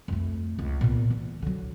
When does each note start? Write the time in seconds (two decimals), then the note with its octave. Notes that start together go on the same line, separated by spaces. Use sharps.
0.08 F2 A3
0.59 C#2
0.81 A#2 B3
1.10 E3
1.42 D3 F#3